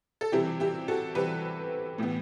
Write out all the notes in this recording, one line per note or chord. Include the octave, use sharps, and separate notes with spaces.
A4
C3 E3 G3 C4 E4 G4
E4 G4
F#4 A4
C3 E3 G3 C4 G4 B4
A2 E3 B3